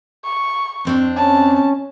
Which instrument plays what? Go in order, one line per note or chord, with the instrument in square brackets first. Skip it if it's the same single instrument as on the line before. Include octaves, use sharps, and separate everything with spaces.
[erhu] C#6
[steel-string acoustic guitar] F2 C4 D4
[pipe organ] C#4 [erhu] A5